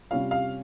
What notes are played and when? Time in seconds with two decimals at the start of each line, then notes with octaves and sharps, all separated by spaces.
0.11 C3 G3 C#4 F4 F5
0.31 F5